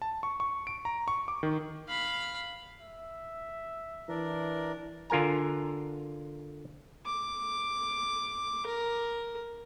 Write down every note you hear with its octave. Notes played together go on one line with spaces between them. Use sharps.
A5
C#6
C#6
D7
A#5
C#6
D6
D#3
F5 B5
E5
E3 D4 A#4
D3 F4 A#4 G#5 A#5
D6
A#4